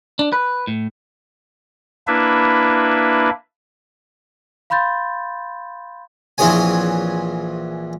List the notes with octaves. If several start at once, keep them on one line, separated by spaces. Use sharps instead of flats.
D4
B4
A2
A#3 D4 E4 B4 E5
F5 B5 C6 G6 A6
A#1 E3 C4 G#4 C#5 G#5